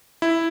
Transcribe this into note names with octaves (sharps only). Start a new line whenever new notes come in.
E4